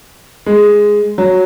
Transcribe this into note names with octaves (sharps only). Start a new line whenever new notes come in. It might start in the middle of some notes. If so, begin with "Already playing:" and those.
G#3
F#3